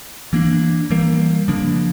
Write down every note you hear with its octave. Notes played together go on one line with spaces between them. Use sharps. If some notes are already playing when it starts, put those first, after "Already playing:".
E3 A#3 D4
E3 G3 A#3
C#3 F3 A#3 D4